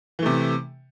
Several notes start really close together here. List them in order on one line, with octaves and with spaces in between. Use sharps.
E3 A3 C3